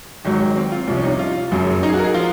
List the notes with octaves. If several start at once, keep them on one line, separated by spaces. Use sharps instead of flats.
G#1 G#2 D#3 F#3
C4
F4
C2 C3 F3 F4
C#4
D#4
F4
F#1 F#2 C#3 F#3
D#4
G#4
F#4
A#4
G#4
F3 F4